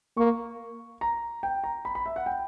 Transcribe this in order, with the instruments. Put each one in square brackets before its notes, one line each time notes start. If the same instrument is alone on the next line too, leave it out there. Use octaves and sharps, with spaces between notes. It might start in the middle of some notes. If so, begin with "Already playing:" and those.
[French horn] A#3 [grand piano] C#6
[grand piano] A#5
G5
A#5
B5
B5
E5
F#5
G5